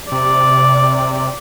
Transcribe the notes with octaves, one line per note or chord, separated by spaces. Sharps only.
C3 D5